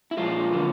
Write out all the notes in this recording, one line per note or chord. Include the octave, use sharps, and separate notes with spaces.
E4
A#2 F3 G#3 F4
D3 F#3 A#3